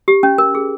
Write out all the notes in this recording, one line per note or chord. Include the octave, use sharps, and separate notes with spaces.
G4
C#4
A#4
G#4